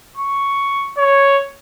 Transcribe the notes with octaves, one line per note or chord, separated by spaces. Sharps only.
C#6
C#5